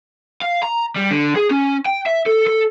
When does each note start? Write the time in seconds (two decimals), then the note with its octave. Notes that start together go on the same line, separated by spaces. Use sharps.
0.42 F5
0.63 A#5
0.96 G3
1.11 D3
1.36 G#4
1.50 C#4
1.86 G5
2.06 E5
2.26 A4
2.47 A4